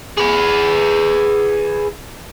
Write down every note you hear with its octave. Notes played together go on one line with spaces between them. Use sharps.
G#4 B4